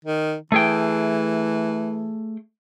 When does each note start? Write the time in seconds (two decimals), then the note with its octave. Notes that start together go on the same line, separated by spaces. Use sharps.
0.05 D#3
0.52 E3 A3 G#4 G5